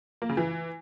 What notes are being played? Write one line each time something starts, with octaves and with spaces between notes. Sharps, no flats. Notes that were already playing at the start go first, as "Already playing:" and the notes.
A#3
C#3
E3